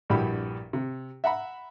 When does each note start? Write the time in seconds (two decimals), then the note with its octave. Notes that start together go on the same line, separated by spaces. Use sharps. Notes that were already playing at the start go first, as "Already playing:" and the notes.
0.10 A#1 G2 E4 F#4 G4 B5
0.73 C3
1.24 E5 F#5 A#5 B5